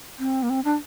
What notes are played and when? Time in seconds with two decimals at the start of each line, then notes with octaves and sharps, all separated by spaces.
0.19 C4
0.43 A#3
0.50 C4
0.64 D4